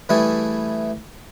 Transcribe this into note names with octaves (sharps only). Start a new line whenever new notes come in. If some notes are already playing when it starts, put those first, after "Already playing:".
E3 G3 A3 E4 G#4